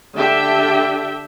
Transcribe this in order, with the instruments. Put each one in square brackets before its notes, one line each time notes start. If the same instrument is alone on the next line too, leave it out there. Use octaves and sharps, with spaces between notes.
[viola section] D3 D4 G4 E5 G5